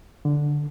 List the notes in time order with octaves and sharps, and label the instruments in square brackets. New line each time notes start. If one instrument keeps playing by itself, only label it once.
[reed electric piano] D3